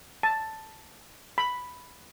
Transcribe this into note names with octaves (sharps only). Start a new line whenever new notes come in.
A5
B5